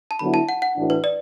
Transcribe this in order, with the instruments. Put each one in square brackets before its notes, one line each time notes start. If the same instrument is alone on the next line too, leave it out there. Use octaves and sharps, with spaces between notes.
[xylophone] A5
[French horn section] D3 F#3 B3 E4 [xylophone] B5
[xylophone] A5
F#5
F#5
[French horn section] A2 E3 D4 F#4
[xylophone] B4
D5